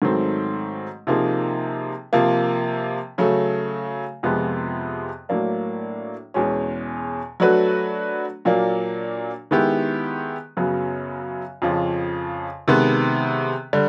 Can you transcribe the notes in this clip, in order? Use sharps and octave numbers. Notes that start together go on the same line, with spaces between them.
G#2 D#3 F#3 A3 C4
C3 F3 A#3 D#4 G#4
C3 F3 A#3
C#3 F#3 A3
F2 C3 F3 G#3 B3
A2 F#3 A#3 D4
E2 B2 G#3 C#4
F#3 A3 D4 F#4 B4
A#2 F#3 A#3 D4
D#3 G#3 B3 E4 G4
F#2 C#3 F#3 B3
F2 C#3 F3
C3 D#3 G#3 B3
D3 G3